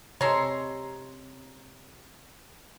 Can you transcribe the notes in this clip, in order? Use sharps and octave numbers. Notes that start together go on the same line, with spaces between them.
C3 G#3 A4 C#5 A#5 C6